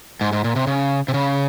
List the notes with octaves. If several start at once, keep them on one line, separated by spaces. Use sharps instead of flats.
G#2
G#2
A#2
C3
C#3
C3
C#3